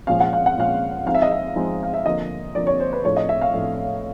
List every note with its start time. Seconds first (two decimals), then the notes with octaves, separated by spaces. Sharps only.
0.07 A#2 F3 G#3 C#4 F5
0.20 F#5
0.33 F5
0.46 F#5
0.57 A#2 F3 G#3 C#4 F5
1.06 F3 G#3 C4 D#4 F5
1.15 E5
1.22 D#5
1.31 E5
1.56 F3 G#3 C4 D#4
1.83 F5
1.94 E5
2.05 D3 F3 A#3 D#5
2.55 D3 F3 A#3 D5
2.67 C#5
2.80 C5
2.93 B4
3.04 A2 F3 A3 D4 C#5
3.17 D#5
3.29 E5
3.41 F5
3.54 A2 F3 A3 D4